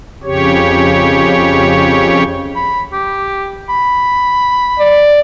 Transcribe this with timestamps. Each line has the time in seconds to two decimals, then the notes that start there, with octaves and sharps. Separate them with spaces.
0.24 F2 C#3 G4 C#5
2.56 B5
2.92 G4
3.69 B5
4.79 D5